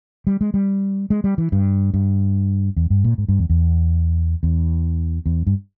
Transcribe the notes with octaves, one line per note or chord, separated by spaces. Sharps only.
G3
G#3
G3
G#3
G3
E3
G2
G2
E2
G2
A#2
G#2
G2
E2
E2
E2
E2
G2